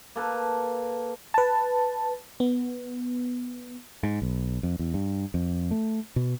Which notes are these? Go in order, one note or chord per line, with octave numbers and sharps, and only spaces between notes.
A#3 A4 B4 A5
B4 A5
B3
G#2
B1
F2
E2
G2
F2
A3
B2